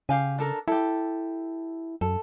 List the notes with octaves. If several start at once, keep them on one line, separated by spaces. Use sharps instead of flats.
C#3 G4 F5 G#5
D4 A4 A#4
E4 G4 A4
F#2 A4